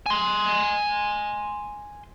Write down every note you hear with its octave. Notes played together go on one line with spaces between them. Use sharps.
G#5 C6